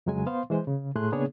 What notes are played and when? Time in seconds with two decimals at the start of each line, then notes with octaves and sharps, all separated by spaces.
0.06 F2 C#3 F#3 G#3 G#5
0.27 B3 C5 F5 C6
0.50 E3 G#3 C5
0.67 C#3
0.95 A2 A3 G#4 C6 F#6
1.12 C#3 A#3 B3 D4 G#4 C#5